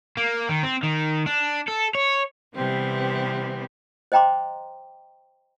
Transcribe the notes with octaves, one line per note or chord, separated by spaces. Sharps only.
A#3
D#3
C4
D#3
D4
A4
C#5
C3 E3 G3 B3 C4
C5 D#5 G5 A#5 C6 D6